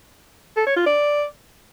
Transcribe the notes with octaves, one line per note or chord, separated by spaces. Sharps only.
A4
C#5
F4
D5